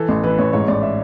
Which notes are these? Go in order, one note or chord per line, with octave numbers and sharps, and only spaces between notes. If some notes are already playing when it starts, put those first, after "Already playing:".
Already playing: E3 A4
A1
E3 B4
A1 C#5
G#2 C#5
A1 D5
E5